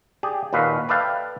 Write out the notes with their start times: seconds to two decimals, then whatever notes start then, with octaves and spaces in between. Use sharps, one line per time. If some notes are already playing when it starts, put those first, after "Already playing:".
0.23 G4 G#4 D5
0.53 D#2 A#2 F#4 B4 F5
0.88 A4 B4 D5 E5 F5 G5